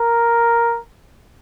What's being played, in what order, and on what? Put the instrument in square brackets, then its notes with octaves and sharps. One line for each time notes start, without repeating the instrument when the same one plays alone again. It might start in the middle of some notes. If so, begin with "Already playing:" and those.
Already playing: [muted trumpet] A#4